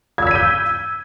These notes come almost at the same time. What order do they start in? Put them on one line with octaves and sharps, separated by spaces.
G#6 E6 B6 D#7 G6